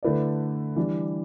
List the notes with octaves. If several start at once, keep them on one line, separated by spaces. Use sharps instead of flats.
D3 A3 E4 B4 D5
E3 G3 D4